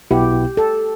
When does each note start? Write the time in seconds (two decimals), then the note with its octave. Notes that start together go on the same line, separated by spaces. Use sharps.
0.11 B1 B2 B3 E4 G4
0.57 A4